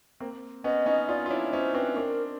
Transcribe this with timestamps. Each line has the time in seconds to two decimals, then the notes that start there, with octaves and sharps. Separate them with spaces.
0.20 A#3 C4
0.64 B3 C#4 D#5
0.86 C#4 D#4
1.08 D#4 F4 D5
1.26 F4
1.30 D4 E4 C#5
1.53 C#4 D#4 C5
1.74 C4 D4 B4
1.96 C4 D4 A#4